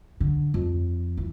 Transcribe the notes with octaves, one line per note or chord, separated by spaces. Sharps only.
D3
F2
E3